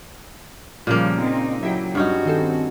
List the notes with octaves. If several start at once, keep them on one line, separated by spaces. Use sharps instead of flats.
A#2 C#3 F3 G3 A#3
C4 D#4
F#3 E4 G4
G2 C#4 D#4 F#4
D#3 C4 A4